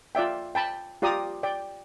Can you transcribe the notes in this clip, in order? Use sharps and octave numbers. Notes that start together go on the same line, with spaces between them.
F4 D5 E5 G5
G5 A5 B5
F4 G4 D5 A#5 D#6
D5 G5